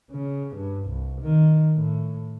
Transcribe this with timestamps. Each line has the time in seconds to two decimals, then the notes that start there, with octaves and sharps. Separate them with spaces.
0.11 C#3
0.56 G2
0.86 C2
1.22 D#3
1.76 A2